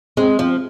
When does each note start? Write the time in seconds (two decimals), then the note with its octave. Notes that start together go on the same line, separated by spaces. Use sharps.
0.17 G#3 C4
0.39 F3 C4